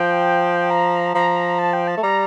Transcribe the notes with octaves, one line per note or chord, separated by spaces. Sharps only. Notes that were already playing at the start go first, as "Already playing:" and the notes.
Already playing: F3 G5
A#5
F3 A#5
A5
G5
A5
A3
G3 A#5